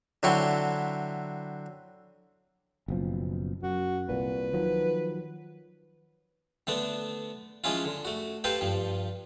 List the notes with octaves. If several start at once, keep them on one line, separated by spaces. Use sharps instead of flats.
D3 F#3 C4 E4 G5 C#6
F#1 B2 F3
F#2 F#4
C2 A#2 B4
D#3 F3 F#3
D3 A3 B3 D4
F3 G#3 C#4 E4 F4
D3
A3 F#4
G4 A4 B4 C5 F5
G2 F3